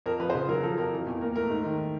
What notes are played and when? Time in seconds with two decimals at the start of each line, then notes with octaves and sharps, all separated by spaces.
0.06 F2 A#4
0.20 F3 B4
0.30 C5
0.34 C#3 B4
0.49 F#3 A#4
0.63 F3 A4
0.78 F2 A#4
0.92 E3
1.07 E2
1.21 A#2 A#4
1.36 A3 A#4
1.50 G#2
1.64 D#3